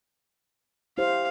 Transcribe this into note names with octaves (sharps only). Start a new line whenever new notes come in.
E4 G4 C5 F5